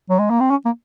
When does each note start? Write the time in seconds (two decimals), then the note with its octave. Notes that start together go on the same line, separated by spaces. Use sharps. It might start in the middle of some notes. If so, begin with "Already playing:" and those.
0.09 F#3
0.19 G#3
0.30 A#3
0.40 C4
0.51 C#4
0.65 A#3